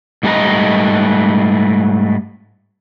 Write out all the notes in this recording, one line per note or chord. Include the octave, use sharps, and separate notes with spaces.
G#2 G3 A3 B4 D#5 A#5